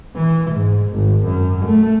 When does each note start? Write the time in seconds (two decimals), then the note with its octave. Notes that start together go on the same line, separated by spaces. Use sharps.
0.15 E3
0.51 G#2
0.92 G#1
1.27 F#2
1.66 A3